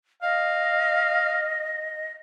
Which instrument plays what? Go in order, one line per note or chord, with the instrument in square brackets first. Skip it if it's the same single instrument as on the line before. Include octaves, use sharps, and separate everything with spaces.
[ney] D#5 [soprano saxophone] F5